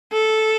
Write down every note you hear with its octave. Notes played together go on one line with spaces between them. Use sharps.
A4